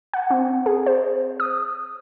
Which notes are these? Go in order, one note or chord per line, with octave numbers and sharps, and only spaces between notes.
F#5
C4
G#4
C5
D#6